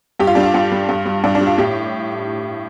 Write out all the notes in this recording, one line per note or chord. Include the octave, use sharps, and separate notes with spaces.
G2 G4
F4
G3 D4
F4
G2 F4
G3
G2
G3
G2 D4
D4
G3
F4
A2 G4